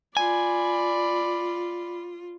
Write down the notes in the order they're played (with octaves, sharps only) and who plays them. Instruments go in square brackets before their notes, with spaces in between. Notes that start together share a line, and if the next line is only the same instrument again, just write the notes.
[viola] F4 [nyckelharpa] D5 B5 [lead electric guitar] G#5